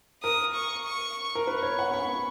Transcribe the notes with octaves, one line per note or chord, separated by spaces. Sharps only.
A#4 D#6
C#6
C#6
A#4
B4 C#6
C#5
F#5
B5